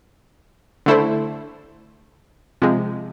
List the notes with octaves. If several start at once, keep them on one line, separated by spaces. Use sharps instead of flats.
D3 A3 E4 A4 C5
C3 F3 G#3